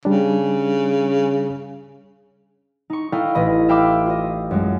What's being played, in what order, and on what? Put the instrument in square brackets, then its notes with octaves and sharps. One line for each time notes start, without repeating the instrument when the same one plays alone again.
[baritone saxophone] C#3 [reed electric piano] G3 D4
[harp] D#4 C#6
D#4 E4 A4 D#5 F5 G5
A1 D#5 B5
E5 F5 G5 B5 D6 E6
F4 D#5
F#2 G#3